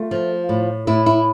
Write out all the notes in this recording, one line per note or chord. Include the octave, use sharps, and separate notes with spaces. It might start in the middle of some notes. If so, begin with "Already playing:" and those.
Already playing: A3 F4
F3
A2
A2 E4
E4